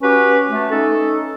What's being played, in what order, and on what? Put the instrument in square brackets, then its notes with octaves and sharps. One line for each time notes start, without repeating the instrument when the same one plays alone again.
[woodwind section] C#4 F#4 G4 B4
A3
C#4 D#4 A4